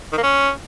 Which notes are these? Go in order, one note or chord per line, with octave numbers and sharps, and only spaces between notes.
D#3
A#3
C#4